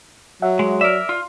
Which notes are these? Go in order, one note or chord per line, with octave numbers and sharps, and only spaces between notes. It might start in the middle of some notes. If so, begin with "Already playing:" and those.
F#3 E5 F#5
G#3
A#4 D5 E5
F4